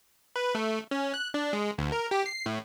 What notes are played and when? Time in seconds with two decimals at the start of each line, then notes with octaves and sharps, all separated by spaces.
0.36 B4
0.55 A3
0.91 C#4
1.14 F#6
1.34 D4
1.53 G#3
1.78 D2
1.92 A#4
2.11 G4
2.26 C7
2.46 A2